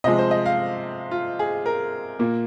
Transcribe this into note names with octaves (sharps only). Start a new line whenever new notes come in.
C3 F3 G#3 D#5
C5
D#5
F5
F4
G#4
A#4
A#2 A#3